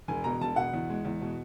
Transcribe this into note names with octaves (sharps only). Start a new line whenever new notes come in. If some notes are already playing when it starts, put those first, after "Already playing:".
E1 G#5
B2 A#5
E1 A5
B2 F#5
E2
G#3
E2
B2